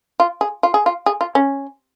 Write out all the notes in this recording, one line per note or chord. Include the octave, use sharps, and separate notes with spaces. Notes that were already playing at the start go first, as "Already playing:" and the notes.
F4
G#4
F4
G#4
F4
G#4
F4
C#4